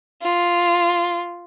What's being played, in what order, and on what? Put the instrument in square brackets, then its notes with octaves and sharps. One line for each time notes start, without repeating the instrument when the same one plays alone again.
[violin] F4